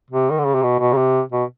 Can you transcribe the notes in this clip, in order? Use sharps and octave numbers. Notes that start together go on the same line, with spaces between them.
C3
D#3
D3
C#3
C3
B2
B2
C#3
C3
B2